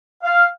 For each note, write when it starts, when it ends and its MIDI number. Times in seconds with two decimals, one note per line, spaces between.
0.23 0.46 77